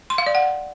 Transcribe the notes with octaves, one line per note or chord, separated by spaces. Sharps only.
C6
F5
D5
F#5